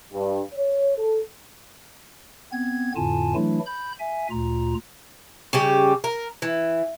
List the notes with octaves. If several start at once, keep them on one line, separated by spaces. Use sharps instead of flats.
G2
C#5
A4
B3 C4 G#6
F2 A2 D3 F4 G#5 A5
E3 F#3 A3 D4 E4
B5 G6
E5 G#5
D2 A#2 F4 A#5
C#3 G3 G4
A#4
E3